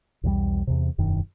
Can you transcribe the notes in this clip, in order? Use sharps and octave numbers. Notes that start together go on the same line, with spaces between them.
B1 E2 F3 G3
E2 C3
E1 F#2 D#3